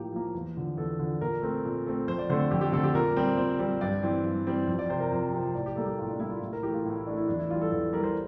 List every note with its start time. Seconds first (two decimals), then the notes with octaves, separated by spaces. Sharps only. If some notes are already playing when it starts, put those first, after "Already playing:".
Already playing: A2 F3 A#3 G4
0.12 F3 A#3
0.35 E2
0.56 D3 F3
0.77 E2 A4
0.99 D3 F3
1.21 A#2 A#4
1.42 A3 C4
1.65 A#2
1.86 A3 C4
2.08 F2 C5
2.18 D5
2.30 D3 A3 C4 C5
2.40 A4
2.51 F2 G4
2.61 G4
2.72 D3 A3 C4 A4
2.84 G4
2.94 A#2 A#4
3.16 G3 C4
3.37 A#2 C5
3.59 G3 C4
3.81 G2 D5
4.03 E3 G3 C4
4.24 G2
4.47 E3 G3 C4
4.67 F2
4.79 D5
4.90 C3 F3 C5
5.00 A#4
5.11 F2 C5
5.33 C3 F3
5.55 A2 D5
5.66 G4
5.76 G3 A#3 A4
5.87 G4
5.98 A2 F4
6.10 D4
6.20 G3 A#3 E4
6.30 F4
6.42 A2
6.53 A#4
6.63 E3 A3 G4
6.74 F4
6.85 A2 E4
6.96 E4
7.07 E3 A3 D4
7.17 E4
7.28 E2 D4
7.39 E4
7.49 E3 G3 F4
7.61 A4
7.72 E2 A4
7.93 E3 G3 A#4
8.04 C5